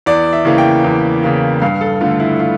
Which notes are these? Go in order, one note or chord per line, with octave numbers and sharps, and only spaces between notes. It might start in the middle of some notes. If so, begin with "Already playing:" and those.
E2 D5
E5
C#3 E3 A#3
G5
E2
C#3 E3 A#3
G2 F5
A4
D3 A3 F4
E4
F4